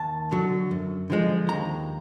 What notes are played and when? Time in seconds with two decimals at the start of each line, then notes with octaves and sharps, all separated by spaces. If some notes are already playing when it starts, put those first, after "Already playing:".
Already playing: D#2 A5
0.32 D3 F#3
0.71 F#2
1.10 D3 F3 G#3
1.49 D#2 A#5